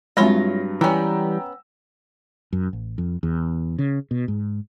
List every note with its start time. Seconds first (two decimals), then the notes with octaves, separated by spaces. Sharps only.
0.17 G2 F#3 G#3 C4 E4 F4 C#5 A#6
0.81 E3 G3 B3 C#4 G5 A#5 E6
2.53 F#2
2.73 A1
2.98 F2
3.23 E2
3.79 C#3
4.11 B2
4.28 G#2